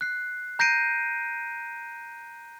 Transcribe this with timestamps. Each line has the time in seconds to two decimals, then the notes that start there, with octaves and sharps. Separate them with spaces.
0.01 F#6 C7
0.59 A#5 G6 A#6 C7 D7 D#7